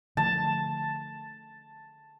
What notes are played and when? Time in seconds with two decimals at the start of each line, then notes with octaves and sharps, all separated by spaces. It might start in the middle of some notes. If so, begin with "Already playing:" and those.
0.17 D3 F3 A3 A5